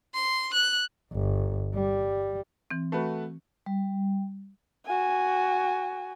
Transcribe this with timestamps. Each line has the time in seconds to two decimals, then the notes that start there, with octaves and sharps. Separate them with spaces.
0.14 C6
0.54 F#6
1.13 G1
1.74 G3
2.71 E3 C4
2.92 A3 F#4 B4
3.66 G3
4.86 F#4 G#5